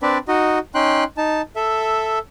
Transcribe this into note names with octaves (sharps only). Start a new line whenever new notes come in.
C4 D4 B4 D5
D#4 F#4 D#5
C#4 D#4 G5 C6 F#6
D#4 A5
A4 E5